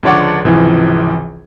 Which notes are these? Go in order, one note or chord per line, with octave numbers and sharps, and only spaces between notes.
C#2 D3 F3 C#5 D5 F#5
G#1 C#2 C3 E3 F3